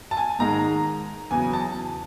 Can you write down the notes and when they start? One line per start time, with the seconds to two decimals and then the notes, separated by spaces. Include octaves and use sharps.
0.11 A5
0.17 G#5
0.39 G#2 D#3 G#3 A#5
1.31 E2 C#3 F#3 G#5
1.53 A5